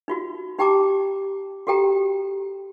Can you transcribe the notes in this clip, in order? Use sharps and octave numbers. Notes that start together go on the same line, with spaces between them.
D#4 F4 F#4
D#4 G4 G5 A5 A#5 D6
F#4 G4 A4 G5 A#5